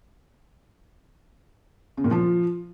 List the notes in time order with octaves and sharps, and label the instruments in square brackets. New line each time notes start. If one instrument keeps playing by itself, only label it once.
[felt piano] C#3
A#2
F3